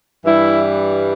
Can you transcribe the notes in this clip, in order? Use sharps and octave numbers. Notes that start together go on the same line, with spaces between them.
G2 E3 G3 E4